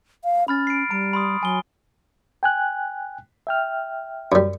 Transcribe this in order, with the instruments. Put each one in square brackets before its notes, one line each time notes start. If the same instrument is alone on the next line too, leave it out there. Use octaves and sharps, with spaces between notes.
[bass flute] F5
[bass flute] C#4 [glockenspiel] B5 F6 A6
[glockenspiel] C7 D7
[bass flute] G3 [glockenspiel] A#5 D7
[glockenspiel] B5 C6 D#6
[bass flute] F#3 [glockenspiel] G#5 G7
[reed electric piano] G5 G#5 F#6
E5 G5 F6
[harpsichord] F#2 G3